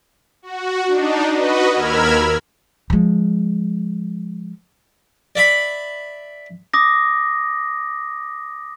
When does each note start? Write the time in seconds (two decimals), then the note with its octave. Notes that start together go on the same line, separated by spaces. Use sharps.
0.42 F#4
0.87 D4 D#4
1.32 F#4 B4 D#5
1.71 D#2 A#4 B5 E6 F6 G#6
2.90 F3 G#3
5.36 D5 E5 B5
6.74 D6 D#6 A#6